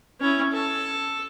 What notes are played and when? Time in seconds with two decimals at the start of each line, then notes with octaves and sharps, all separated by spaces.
0.21 C#4 E4
0.53 A4